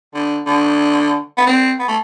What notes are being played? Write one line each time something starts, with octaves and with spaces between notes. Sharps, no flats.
D3
D3
B3
C4
B3
A3